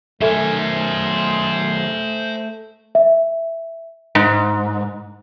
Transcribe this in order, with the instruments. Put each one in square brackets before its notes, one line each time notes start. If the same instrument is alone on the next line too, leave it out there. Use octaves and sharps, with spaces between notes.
[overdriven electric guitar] B1 D#3 [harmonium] A3 [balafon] A4 E5 [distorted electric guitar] C5 G#5
[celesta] E5
[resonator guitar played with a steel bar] G#2